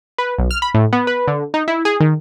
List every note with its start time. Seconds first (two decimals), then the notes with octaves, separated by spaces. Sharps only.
0.18 B4
0.38 B1
0.51 F6
0.62 B5
0.74 A2
0.93 B3
1.07 B4
1.28 D3
1.54 D#4
1.68 E4
1.85 G#4
2.00 D#3